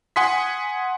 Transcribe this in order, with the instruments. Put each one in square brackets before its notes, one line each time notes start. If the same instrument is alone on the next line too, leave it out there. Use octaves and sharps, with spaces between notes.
[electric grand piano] F#5 G#5 C6 D#6 B6